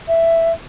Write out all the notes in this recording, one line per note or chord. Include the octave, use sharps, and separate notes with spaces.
E5